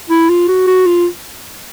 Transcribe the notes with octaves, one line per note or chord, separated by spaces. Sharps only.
E4
F4
F#4
F#4
F4